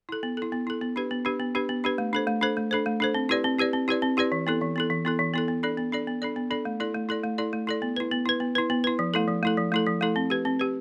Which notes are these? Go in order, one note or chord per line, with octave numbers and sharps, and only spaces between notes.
E4 A4
B3
E4 A4
B3
E4 A4
B3
D4 G4 B4
B3
D4 G4 B4
B3
D4 G4 B4
B3
D4 G4 B4
A3
D4 A4 C5
A3
D4 A4 C5
A3
D4 A4 C5
A3
D4 A4 C5
C4
E4 G4 B4 D5
C4
E4 G4 B4 D5
C4
E4 G4 B4 D5
C4
E4 G4 B4 D5
E3
B3 E4 A4
E3
B3 E4 A4
E3
B3 E4 A4
E3
B3 E4 A4
B3
D4 A4 D5
B3
D4 A4 D5
B3
D4 A4 D5
B3
D4 A4 D5
A3
E4 A4 D5
A3
E4 A4 D5
A3
E4 A4 D5
A3
E4 A4 D5
B3
E4 B4
B3
E4 B4
B3
E4 B4
B3
E4 B4
F3
A3 E4 A4
F3
A3 E4 A4
F3
A3 E4 A4
F3
A3 E4 A4
C4
G4 B4
C4
G4 B4